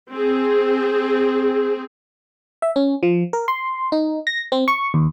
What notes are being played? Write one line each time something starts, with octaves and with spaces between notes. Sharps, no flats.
C4 G#4
E5
C#4
F3
A#4
C6
D#4
A#6
C4
C#6
D#2